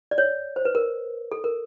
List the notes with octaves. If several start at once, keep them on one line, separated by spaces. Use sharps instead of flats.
D5
C#5
C5
B4
A#4
A4
A#4